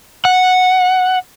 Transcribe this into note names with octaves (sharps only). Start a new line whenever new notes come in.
F#5